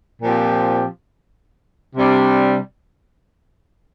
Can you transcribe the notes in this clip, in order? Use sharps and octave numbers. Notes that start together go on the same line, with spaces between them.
A#2 F3 C4 G4
C3 G3 D4